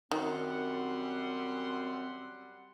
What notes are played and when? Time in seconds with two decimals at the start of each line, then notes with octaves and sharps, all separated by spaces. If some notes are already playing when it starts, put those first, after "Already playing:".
0.11 F#2 D#3 G3 C4 F#5 C6